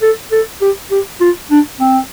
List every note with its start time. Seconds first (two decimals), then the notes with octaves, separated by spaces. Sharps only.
0.02 A4
0.32 A4
0.61 G4
0.91 G4
1.21 F4
1.51 D4
1.81 C4